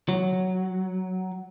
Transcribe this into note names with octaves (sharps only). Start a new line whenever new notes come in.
F#3